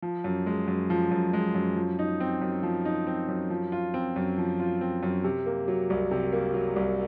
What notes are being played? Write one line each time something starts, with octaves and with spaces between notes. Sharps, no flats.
F3
F#2
G#3
F#2
F3
F#2
G#3
F#2
F3
D#4
C4
F#2
F3
D#4
C4
F#2
F3
F4
C4
F#2
F3
F4
C4
F#2
C3
A#3
F#3
C2
C3
A#3
F#3
C2